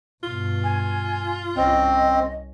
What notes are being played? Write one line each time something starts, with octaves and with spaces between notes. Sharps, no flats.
G2 B2 F4
G#5
C2 C4 C#4 D#5